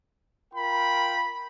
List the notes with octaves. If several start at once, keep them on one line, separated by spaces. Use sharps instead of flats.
F4 A#4 G5 B5